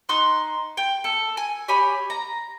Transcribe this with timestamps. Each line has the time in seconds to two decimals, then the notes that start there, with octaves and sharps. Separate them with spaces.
0.09 D#4 C6 F#6
0.77 G5
1.04 A4
1.37 G#5
1.68 G4 C#5 G#5 B5
2.10 A#5